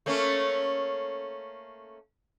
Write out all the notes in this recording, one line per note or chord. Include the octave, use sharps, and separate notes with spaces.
A3 A#3 C#4